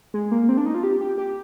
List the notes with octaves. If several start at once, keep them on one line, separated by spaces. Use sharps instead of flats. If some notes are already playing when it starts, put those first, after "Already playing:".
G#3
A#3
C4
D4
D#4
F4
G4
G4
G4